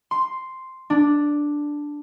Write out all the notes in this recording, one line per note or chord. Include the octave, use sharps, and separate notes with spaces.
C6
D4